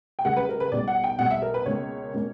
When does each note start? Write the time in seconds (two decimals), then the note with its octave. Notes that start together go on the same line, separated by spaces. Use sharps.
0.19 G5
0.25 C#2 C#3 G3 A#3 F#5
0.37 B4
0.49 A#4
0.60 B4
0.72 B1 B2 G3 D5
0.88 F#5
1.04 G5
1.19 B1 B2 G3 F#5
1.31 E5
1.42 A#4
1.54 B4
1.66 C#2 B2 A#3 C#4 C#5
2.14 B2 A#3 C#4